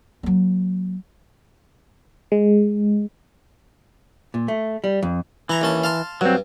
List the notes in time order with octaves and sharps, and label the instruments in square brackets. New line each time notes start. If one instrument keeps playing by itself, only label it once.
[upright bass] F#3 A#3
[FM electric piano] G#3
[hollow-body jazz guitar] A#2
A3
G3
F2
[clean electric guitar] E3 [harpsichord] E4 A#5
[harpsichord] D#2 C#4 A5
F5 A5 C6
[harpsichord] G2 [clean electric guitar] F#3 C4